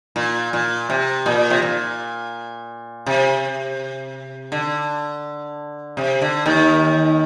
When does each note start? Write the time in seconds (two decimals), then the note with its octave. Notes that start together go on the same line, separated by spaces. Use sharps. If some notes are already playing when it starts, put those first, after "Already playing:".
0.16 A#2
0.53 A#2
0.90 C3
1.26 A#2
1.50 C3
1.62 A#2
3.06 C3
4.52 D3
5.97 C3
6.22 D3
6.46 D#2 D#3